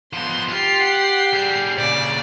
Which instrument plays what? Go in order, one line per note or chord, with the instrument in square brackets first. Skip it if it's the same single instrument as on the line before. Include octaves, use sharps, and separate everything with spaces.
[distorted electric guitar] F3 B3 [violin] C6
[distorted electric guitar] F4 [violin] G4 C7
[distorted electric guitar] F#5
G3 G#4
[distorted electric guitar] A#2 C#3 [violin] D5